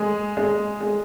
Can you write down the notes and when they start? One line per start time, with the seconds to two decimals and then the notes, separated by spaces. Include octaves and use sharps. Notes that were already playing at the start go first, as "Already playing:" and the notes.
Already playing: G#3 G#4
0.37 G#3 G#4
0.80 G#3 G#4